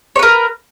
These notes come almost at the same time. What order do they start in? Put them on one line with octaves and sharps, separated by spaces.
C#5 B4 A#4